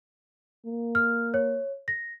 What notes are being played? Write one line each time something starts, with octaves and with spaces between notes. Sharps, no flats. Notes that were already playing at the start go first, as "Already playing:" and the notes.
A#3
F6
C#5
A#6